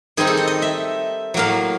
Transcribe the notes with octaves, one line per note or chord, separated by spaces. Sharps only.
D#3 G3 C4 D#4 G#4
A4
D#5
D#5
E5
A2 F#3 A#3 F5